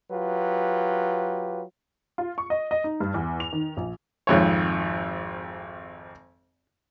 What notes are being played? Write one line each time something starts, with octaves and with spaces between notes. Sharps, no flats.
F#3 F4 G4 B4
F4
C#6
D#5
D#5
D#4
G2
E2
F7
D#3
A#1
G#1 F2 C#5